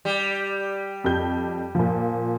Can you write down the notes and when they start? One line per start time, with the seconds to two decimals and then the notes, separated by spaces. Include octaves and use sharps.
0.05 G3
1.04 F2 G4 G6
1.75 A#2 F3